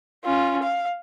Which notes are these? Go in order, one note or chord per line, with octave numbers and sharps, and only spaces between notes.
C#4 F4
F5